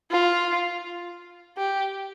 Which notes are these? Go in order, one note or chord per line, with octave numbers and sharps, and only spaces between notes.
F4
G4